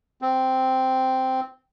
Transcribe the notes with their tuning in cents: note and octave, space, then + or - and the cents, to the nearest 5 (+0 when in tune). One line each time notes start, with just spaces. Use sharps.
C4 -5